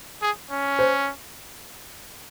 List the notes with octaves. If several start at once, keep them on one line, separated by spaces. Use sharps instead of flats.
G#4
C#4
C5